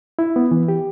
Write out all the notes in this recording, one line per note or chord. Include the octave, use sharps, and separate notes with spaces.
E4
B3
E3
G4